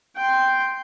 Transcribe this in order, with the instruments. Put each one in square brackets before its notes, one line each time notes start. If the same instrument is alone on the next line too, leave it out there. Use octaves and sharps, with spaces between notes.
[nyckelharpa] G5 C6